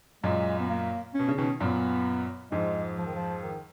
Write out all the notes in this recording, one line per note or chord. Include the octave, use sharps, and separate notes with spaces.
F#2 A#2 G#3
B3
A#3
C#4
B2
C#3
B2 D#3 C#4
F#2 A#2 B3
F2 G#2 G#3
F3
D#3
F3
D#3